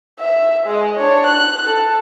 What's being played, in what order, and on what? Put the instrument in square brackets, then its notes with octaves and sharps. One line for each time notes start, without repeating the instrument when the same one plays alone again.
[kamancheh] E5
G#3 D#5
D4 C#5
F#6
A4